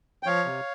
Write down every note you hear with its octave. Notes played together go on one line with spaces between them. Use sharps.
G5
F3 C#5 F5
C3